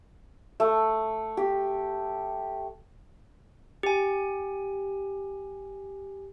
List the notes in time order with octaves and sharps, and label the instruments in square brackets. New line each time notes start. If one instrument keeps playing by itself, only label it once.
[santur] A3
G4
[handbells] G4 G#5